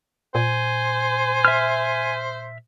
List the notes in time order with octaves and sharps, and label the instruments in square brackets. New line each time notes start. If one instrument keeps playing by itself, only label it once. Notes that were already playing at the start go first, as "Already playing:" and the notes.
[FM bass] A#2 [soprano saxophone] C5 [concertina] G#5
[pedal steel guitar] E5 F6